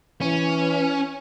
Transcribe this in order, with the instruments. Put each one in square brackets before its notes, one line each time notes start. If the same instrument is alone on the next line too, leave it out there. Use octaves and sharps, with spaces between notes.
[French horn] E3 [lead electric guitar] C#4